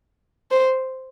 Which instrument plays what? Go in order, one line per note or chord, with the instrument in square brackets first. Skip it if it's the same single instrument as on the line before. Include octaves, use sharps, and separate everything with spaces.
[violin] C5